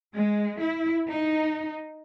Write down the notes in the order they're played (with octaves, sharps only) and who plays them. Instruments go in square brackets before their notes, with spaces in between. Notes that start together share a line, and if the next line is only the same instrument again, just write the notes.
[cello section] G#3
E4
D#4